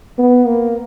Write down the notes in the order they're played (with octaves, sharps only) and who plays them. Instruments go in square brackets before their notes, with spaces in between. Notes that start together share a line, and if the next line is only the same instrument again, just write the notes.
[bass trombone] B3
A#3